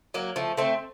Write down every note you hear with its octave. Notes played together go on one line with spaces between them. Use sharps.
F#3 A#3
F3 A3
A3 C4